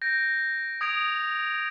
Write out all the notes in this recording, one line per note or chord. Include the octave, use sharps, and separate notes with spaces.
G6 A#6 D7
D#6 G#6 D7 F7